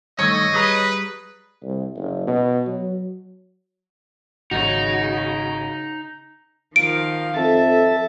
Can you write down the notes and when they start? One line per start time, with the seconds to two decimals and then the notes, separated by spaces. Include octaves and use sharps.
0.19 G2 D#3 A3 C#5 D#5
0.53 G3 G#4 B4 A#5
1.63 C2
1.96 F#1
2.27 B2
2.67 F#3
4.51 G#1 C#3 D#4 F#4
6.76 D#3 F3 F5 D7
7.36 F2 A4 E5 A6